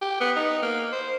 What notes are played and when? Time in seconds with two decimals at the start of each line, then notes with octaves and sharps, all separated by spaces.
0.01 G4
0.20 B3
0.36 D#4
0.62 A#3
0.92 C5